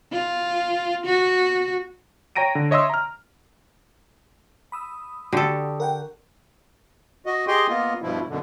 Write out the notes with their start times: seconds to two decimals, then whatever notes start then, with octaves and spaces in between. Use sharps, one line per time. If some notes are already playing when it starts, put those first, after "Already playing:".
0.12 F4
1.06 F#4
2.36 C#5 G5 A#5 A#6 D7 D#7
2.55 D3
2.71 C#5 D#5 E5 C6 E6
2.90 A#5 F6
4.72 B5 D#6 E6
5.32 D3 F#4 G4 A4
5.80 A#4 F#5 G5
7.26 F#4 D#5
7.48 G4 G#4 D#5 G5 C6
7.69 A#3 B3 F4 D#5
8.02 G2 B2 F3 E4
8.28 F#2 B2 D3